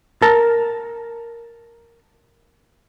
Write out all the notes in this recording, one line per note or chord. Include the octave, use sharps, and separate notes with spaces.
A#4 A5